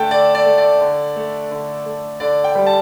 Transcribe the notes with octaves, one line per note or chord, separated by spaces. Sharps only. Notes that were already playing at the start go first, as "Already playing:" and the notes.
Already playing: D3 A3 G5 A5
D3 D5
D5
A3
D5
D3
A3
D3
A3
D3 D5
G5
G3
A5